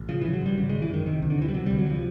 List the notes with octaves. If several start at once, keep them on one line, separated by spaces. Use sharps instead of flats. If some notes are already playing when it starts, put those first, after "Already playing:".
Already playing: A1
C#3 F3
C#3 E3
F#3
G#1 G3
C#3
G#1 G#3
E3
F#2 D#3
C3 D#3
D2
D3
C3 E3
G3
C3 F#3
D2 G3
F#3
C3 F3